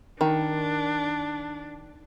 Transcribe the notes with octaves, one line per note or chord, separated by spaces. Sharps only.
D#3 D4